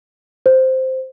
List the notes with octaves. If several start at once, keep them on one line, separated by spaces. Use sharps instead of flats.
C5